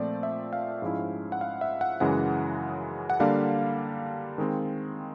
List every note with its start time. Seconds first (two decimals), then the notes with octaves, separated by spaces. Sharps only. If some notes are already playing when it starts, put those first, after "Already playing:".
Already playing: A#2 F3 A3 C4 D5
0.23 E5
0.53 F5
0.82 G#2 F3 G#3 C#4 E4
1.32 F#5
1.41 F5
1.61 E5
1.81 F#5
2.00 F#2 C#3 E3 G#3 F#5
3.10 F#5
3.20 D3 G3 A#3 D4 F5
4.38 D#3 G#3 C4